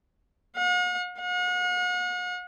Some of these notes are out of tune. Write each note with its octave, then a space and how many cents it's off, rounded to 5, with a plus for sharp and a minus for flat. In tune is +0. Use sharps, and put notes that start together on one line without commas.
F#5 -45
F#5 -40